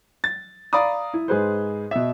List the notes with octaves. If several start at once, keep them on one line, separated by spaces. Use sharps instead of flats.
A6
D5 F5 A#5 B5 D#6
E4
G#2 G#4 B4 C5
B2 E5